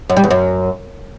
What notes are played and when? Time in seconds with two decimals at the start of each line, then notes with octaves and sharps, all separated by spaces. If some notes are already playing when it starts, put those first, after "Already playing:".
0.10 F#2
0.17 G3
0.24 E2
0.31 F#2